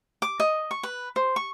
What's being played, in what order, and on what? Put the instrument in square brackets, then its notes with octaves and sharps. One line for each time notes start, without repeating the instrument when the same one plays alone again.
[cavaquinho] D6
D#5
C#6
B4
C5
C#6